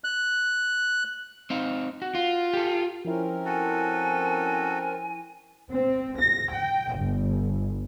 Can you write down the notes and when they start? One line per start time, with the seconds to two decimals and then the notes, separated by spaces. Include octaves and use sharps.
0.04 F#6
1.50 C4 D#4 F5
2.02 F#4
2.15 F4
2.54 G4 A4
3.05 F3 C4 C#4 E4 A#4
3.45 F#4 A4 G#5
5.71 C4
6.19 A#6
6.51 G5
6.94 G1